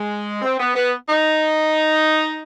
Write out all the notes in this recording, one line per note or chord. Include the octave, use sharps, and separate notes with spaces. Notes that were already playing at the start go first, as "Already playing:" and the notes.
Already playing: G#3
C4
B3
B3
D#4